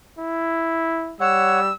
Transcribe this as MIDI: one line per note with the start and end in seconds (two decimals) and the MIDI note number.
0.19 1.15 64
1.20 1.71 55
1.20 1.60 73
1.20 1.60 78
1.20 1.73 88